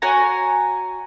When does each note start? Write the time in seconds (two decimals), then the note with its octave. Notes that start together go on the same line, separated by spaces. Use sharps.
0.02 F#4 C#5 G#5 A#5